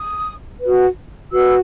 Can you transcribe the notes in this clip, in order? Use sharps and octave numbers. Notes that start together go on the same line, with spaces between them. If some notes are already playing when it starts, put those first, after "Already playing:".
Already playing: D#6
F#4 B4
F#4 B4 E6